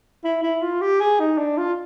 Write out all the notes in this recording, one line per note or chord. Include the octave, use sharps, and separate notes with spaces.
E4
E4
F4
G4
G#4
D#4
D4
F4